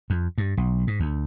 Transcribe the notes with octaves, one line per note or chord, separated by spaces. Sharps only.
F2
G2
B1
G#2
D2